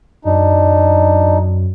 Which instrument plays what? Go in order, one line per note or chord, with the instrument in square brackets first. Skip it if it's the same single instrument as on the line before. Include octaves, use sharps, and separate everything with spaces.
[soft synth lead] F#2 [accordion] D4 D#4